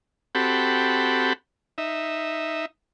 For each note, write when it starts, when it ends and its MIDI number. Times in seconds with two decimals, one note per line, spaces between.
0.35 1.33 60
0.35 1.33 66
0.35 1.33 67
0.35 1.33 69
0.35 1.33 83
1.78 2.66 63
1.78 2.66 76